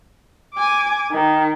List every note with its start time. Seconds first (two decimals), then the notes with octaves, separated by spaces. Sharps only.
0.54 G#5 D6
1.11 D#3